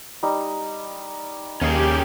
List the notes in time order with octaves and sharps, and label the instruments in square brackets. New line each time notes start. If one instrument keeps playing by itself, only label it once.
[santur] G3 D#4
[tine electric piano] D#2 [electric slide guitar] C#4 G#4 A#4 [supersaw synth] G4